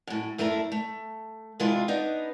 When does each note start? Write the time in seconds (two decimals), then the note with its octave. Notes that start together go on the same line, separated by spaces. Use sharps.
0.07 F#2 A2
0.38 F#2 A3 D4 E4 A#5
0.72 A3
1.60 C3 E3 G#3 D4 E4 F4
1.88 B3 D4 D#4